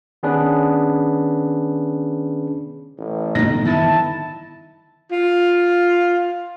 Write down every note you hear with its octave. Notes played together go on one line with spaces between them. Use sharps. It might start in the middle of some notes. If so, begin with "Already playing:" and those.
D#3 B3 C#4 D4 G#4 B4
A1
G1 F#2 A2 D#4 A#6
D#3 E3 B3 E4 A5
F4